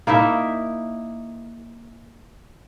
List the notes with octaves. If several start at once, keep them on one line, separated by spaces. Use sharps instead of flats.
A#3 D#4 E4 E5